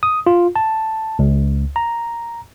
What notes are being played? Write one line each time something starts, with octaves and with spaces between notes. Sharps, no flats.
D#6
F4
A5
C#2
A#5